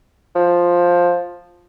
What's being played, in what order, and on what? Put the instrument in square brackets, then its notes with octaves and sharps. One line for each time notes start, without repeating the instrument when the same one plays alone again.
[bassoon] F3